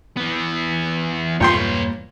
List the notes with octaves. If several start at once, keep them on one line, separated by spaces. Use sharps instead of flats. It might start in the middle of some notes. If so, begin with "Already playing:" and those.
E3 B3
E2 G2 A#2 A#3 B4 C#5 G5 C6